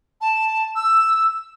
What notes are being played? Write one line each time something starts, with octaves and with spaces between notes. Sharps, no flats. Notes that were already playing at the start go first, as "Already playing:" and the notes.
A5
E6